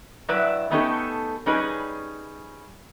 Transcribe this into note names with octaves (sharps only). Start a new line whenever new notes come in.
G2 F#3 E4 B4 D5 E5
A3 B3 C#4 D#4 G4 A4
G3 C#4 D#4 G#4 B4